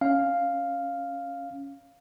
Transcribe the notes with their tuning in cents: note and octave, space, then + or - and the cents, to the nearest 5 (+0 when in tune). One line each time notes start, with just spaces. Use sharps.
C#4 +0 F5 +0